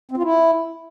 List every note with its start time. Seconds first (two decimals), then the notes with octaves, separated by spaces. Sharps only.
0.11 C4
0.17 F4
0.23 E4